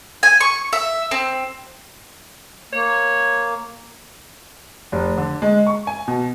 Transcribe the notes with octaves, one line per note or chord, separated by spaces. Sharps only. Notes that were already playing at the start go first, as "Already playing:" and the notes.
G#5
C#6
E5
C4
A#3 C#5
F1
D3
G#3
C#6
G#5
B2